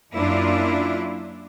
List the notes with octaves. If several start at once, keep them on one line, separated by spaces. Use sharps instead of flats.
F#2 A#3 D4 E4 F4